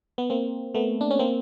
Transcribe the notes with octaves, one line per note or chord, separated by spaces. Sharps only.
B3
A#3 C4
A3 B3
D4
C#4
A#3 C4